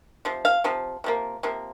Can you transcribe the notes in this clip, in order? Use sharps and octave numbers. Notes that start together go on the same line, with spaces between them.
C3 F3
F5
C3 F3
C3 F3 A#3
C3 F3 A#3